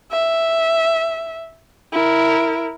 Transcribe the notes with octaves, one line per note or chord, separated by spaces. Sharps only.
E5
E4 A#4